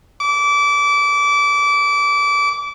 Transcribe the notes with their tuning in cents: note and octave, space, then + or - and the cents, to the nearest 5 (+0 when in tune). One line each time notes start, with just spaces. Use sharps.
D6 -25